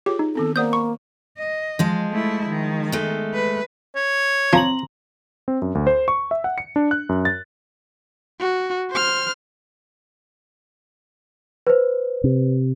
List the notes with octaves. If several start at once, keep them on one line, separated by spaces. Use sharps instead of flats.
F4 G4 G#4 C#5
D#4
D#3 B3 C4 A4
A#3 C5 D5 F#5 D#6 G6
B5 C#6
D#5
F3 G#3
A3 E4
D#3
G#3 A3
B4
C#5
F3 C4 A#5 F#7
C4
F#2
D2
C5
C#6
E5
F#5
C#7
D4
F#6
F#2
A6
F#4
C5 F6
B4 C5
C3